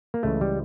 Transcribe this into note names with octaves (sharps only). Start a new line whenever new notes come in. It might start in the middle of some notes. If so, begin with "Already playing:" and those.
A#3
C#2 C#3 E3 A3
G3